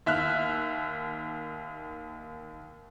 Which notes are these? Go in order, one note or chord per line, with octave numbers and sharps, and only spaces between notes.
D#2 E5 F6 F#6